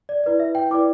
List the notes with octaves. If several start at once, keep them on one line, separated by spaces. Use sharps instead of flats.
D5
E4 B4 D5
E5
G5
E4 B4 D5 D6